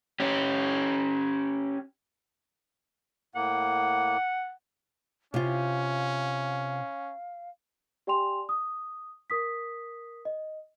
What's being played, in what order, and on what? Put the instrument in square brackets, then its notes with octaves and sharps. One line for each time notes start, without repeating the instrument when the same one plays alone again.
[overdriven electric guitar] C#4 G4
[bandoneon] A2 A#3 [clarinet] F#5
[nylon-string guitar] C3 F4 [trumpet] C#4 [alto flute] F5
[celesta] G4 D5 G5 G#5 C6 F7
D#6
A#4 D#6 B6
D#5